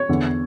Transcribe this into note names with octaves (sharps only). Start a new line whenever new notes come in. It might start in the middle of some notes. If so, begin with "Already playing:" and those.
Already playing: C#5
E2 D3